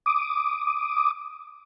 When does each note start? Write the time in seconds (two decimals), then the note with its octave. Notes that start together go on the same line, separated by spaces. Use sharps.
0.06 D6 D#6